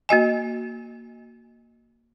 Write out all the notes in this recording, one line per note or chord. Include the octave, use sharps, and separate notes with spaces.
A#3 F#4 D#5 G#5